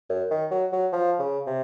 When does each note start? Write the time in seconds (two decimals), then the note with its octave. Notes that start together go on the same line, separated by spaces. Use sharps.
0.10 F#2
0.31 D#3
0.51 F#3
0.72 F#3
0.92 F3
1.19 C#3
1.47 C3